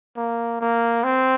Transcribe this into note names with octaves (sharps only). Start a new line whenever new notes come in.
A#3
A#3
C4